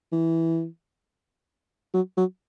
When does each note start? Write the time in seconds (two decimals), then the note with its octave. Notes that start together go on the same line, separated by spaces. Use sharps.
0.12 E3
1.94 F#3
2.17 F#3